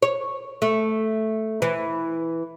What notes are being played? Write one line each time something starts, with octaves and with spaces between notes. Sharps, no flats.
C#5
A3
E3